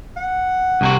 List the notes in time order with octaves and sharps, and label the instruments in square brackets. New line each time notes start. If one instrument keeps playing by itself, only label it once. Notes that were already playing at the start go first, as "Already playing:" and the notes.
[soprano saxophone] F#5
[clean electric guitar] C2 C3 F#4